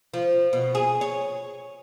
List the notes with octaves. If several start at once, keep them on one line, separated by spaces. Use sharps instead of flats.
F3
B2
G#4
C#5